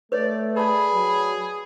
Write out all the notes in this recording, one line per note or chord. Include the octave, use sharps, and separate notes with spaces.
A3 B4 C#5 D5
G#4 B4 D5 A5 B5
F#3